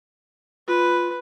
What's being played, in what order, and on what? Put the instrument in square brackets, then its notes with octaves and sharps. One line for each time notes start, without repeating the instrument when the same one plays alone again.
[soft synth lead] F4 [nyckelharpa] B4